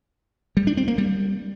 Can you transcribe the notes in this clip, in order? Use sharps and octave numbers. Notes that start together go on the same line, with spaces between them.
G3
D4
C4
A#3
G3